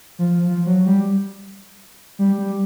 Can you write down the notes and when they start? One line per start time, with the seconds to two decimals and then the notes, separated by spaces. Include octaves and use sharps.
0.19 F3
0.47 F3
0.66 F#3
0.86 G3
2.19 G3
2.38 G3